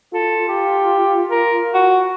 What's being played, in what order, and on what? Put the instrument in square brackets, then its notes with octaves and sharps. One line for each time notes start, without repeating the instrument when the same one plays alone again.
[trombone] F4 [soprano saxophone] A4
[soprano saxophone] G4
A#4
F#4